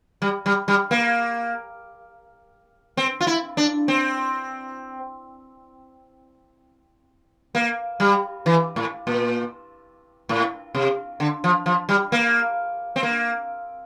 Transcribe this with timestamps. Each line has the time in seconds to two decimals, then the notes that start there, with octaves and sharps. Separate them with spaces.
0.22 G3
0.46 G3
0.68 G3
0.91 A#3
2.97 C4
3.21 F4
3.27 E4
3.57 D4
3.88 C4
7.55 A#3
8.00 G3
8.46 E3
8.76 A2
9.07 A#2
10.29 A2
10.75 C3
11.20 D3
11.44 F3
11.66 F3
11.89 G3
12.12 A#3
12.96 C4
13.03 A#3